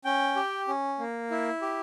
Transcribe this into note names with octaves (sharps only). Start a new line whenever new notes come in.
C#4 G5
G4
C#4
A#3
E4
G4